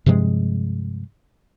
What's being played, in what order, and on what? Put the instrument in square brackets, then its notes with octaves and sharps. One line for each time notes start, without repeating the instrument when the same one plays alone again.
[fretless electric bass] G2 C3 F3 G#3